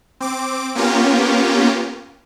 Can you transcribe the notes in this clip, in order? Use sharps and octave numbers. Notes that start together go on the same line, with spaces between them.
C4 D6
A#3 B3 C#4 F4 G4 A#4